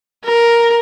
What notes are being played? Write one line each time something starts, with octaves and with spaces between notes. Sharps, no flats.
A#4